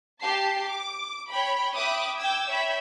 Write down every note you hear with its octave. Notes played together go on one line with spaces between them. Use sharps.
G4 A5 C7
D6
C#5 G5 B5
E5 G5 B5 D6 D#6 F#6
G5 D6 E6 G#6
C#5 E5 G5 B5